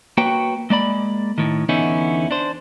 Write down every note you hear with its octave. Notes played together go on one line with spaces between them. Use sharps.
A#3 F#4 B4 C#5 G5
G#3 A#3 D5 B5
A2 D#3
E2 D3 B3 C#4 D#4 E4
D4 C5